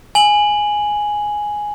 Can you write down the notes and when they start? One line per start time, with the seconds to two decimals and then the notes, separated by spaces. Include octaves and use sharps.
0.15 G#5 F#7